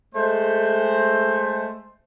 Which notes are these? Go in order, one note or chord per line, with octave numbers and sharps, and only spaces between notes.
G#3 A3 C5